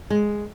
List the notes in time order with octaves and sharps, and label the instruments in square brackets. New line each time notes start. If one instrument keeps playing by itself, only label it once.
[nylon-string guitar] G#3